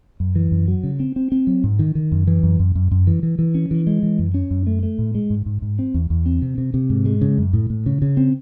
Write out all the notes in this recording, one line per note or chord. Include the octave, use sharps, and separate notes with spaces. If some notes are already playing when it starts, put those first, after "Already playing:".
F#2
E3
F#2
F#3
C#3
C4
C4
C4
F#3
G#2
D#3
D#3
F#2
E3
F#2
F#2
F#2
F#2
E3
E3
E3
C#4
E3
G#3
E3
F#2
C#4
F#2
A3
A3
A2
G#3
G#2
G#2
G#2
C4
E2
E2
C4
C3
C3
C3
G#2
G#3
C#3
F#2
A2
A2
C#3
C#3
C4